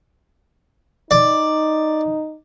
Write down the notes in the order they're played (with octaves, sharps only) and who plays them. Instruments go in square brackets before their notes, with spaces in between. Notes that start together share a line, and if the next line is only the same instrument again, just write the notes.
[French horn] D#4 [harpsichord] D5